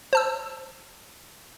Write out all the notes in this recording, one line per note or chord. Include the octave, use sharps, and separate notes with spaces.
C5 A5 E6